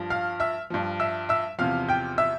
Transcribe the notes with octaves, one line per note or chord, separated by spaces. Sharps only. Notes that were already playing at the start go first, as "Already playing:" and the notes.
Already playing: G2 F3
F5 F6
E5 E6
G2 F3
E5 E6
E5 E6
E2 C3 F3 F5 F6
G5 G6
E5 E6